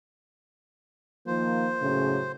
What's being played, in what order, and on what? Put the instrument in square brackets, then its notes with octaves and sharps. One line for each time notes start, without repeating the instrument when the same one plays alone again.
[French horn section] D#3 F3 A#3 [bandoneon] C5
[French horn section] F#2 A2 C#3